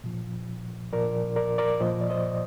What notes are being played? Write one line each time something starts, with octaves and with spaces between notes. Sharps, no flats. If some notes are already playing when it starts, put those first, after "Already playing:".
A#2 F3
A#2 F3 A#4 D5
A#4 D5
A#4 D5
A#2 F3 C5 D#5
D5
C5 D#5